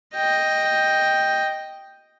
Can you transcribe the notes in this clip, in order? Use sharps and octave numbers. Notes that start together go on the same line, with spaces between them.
D#5 G5